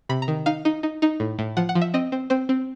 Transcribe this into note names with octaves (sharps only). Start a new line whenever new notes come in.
C3 B5
A#5
D#3
D#4 F5
D#4
D#4
D#4
A2
A2
F3 F#5
F#5
F3
E5
C4 D#5
C4
C4 C5
C4